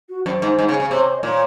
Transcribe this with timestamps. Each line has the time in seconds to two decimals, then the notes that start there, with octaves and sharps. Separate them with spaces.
0.09 F#4
0.26 F#2 C5
0.42 G#2
0.59 G#2
0.68 C#3
0.80 C#3
0.91 C3 C5
0.99 C#5
1.08 C5
1.17 D#5
1.23 A#2 C#5